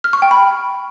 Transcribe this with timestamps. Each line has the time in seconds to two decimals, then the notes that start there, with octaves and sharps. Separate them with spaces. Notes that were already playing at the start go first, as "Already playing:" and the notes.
0.04 F6
0.13 C#6
0.22 G5
0.31 B5